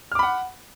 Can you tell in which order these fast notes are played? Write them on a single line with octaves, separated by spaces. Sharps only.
F6 D6 B5 F#5